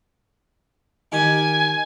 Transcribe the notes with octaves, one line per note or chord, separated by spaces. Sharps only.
D#3 G4 G#5